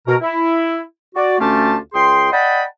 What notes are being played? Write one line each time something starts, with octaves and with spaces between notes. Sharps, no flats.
B2 A#4
E4
F#4 D5
D2 A3 C#4 F4 G4 A5
C#2 G#4 G5 C6
D5 D#5 F#5 G5 A5 B5